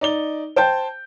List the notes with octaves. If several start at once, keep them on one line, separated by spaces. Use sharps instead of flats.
D#4 D5 G7
C5 G5 A5 G6